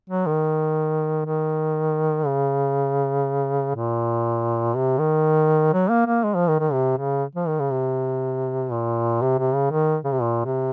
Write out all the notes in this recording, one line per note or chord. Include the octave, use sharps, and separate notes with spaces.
F#3
D#3
D#3
C#3
A#2
C3
D#3
F#3
A#3
A#3
G#3
F3
D#3
D#3
C3
C#3
F3
D#3
C#3
C3
A#2
C3
C3
C#3
D#3
C#3
C3
A#2
C3